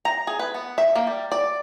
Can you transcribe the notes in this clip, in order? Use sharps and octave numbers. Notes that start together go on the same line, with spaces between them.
A#5
G#4
B4
B3
E5
A#3
G3
D5